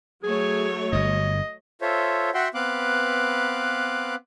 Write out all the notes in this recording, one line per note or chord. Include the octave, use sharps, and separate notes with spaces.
F#3 A3 G#4 C#5
G1 G2 D#5
F4 A4 C5 C#5 E5
F#4 E5 F#5 G5 C6
B3 C4 B4 F5 D6 F#6